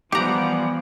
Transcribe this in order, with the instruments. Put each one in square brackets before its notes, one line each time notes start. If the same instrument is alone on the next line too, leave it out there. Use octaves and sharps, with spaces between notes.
[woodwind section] E3 G3 B3 [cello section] F3 [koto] G4 A#5 [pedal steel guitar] F#5 D6